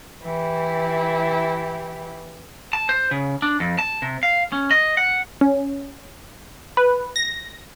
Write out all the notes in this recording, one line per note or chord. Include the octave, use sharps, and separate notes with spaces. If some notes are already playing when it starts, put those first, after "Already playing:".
E3 E4 G4
A5
C5
C#3
D4
F2
A5
C3
F5
C#4
D#5
F#5
C#4
B4
A#6